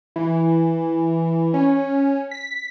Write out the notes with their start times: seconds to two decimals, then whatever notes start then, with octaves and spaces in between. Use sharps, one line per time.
0.16 E3
1.54 C#4
2.31 B6